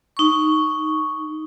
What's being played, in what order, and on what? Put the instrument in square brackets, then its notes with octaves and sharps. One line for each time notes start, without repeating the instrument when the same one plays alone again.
[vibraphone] D#4 C#6